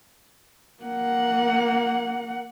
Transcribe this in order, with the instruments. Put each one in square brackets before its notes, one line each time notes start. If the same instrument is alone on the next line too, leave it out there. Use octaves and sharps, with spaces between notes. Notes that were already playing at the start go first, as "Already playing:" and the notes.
[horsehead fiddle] A#3 F#5